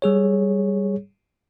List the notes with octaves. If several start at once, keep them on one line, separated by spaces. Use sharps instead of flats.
G3 G#4 C#5